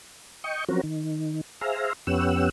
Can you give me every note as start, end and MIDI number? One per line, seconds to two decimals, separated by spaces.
0.44 0.65 75
0.44 0.65 79
0.44 0.65 85
0.69 0.81 53
0.69 0.81 54
0.69 0.81 60
0.69 0.81 61
0.69 0.81 66
0.69 0.81 70
0.83 1.41 51
1.61 1.93 68
1.61 1.93 72
1.61 1.93 76
1.61 1.93 77
1.61 1.93 82
2.07 2.50 41
2.07 2.50 59
2.07 2.50 61
2.07 2.50 67
2.07 2.50 78
2.07 2.50 88